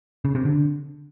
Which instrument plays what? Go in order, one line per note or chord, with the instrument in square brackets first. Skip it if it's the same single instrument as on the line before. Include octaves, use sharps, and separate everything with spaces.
[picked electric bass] C#3
C3
D3